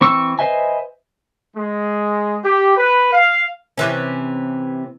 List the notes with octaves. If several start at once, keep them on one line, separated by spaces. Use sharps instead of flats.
E3 C4 C#6 E6
B4 C5 D#5 E5 G#5
G#3
G4
B4
F5
C3 E3 C#4